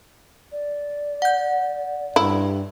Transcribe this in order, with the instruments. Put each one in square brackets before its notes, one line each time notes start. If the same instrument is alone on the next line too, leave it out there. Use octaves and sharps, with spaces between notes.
[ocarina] D5
[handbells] F#5 G6
[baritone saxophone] G2 [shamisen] E4